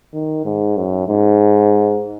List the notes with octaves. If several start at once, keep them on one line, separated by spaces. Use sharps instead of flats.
D#3
G#2
F#2
G#2